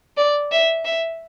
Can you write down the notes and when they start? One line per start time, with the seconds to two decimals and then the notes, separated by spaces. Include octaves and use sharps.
0.17 D5
0.52 E5
0.85 E5